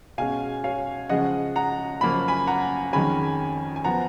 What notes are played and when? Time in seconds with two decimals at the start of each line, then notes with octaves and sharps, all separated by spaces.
0.18 B2 G#3 C#4 F5 G#5
0.64 C#5 F5
1.09 C#3 F3 G#3 C#4 D#5 F#5
1.56 F#5 A#5
2.01 F#2 C#3 F3 A#3 C#4 B5
2.28 G#5 B5
2.47 F#5 A#5
2.93 F2 D#3 G#3 C#4 G#5 B5
3.76 G#5
3.84 F3 B3 F#5 A#5